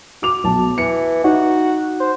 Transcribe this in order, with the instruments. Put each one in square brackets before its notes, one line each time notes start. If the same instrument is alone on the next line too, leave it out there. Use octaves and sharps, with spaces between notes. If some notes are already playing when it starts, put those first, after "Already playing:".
[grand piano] F#4 D6 F7
B1 A5
[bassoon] E3 [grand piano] C#7
[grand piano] D#4 [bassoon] F#4
[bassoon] C5